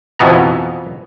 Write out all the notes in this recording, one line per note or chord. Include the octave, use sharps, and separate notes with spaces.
F2 B2 E3 B3 A#5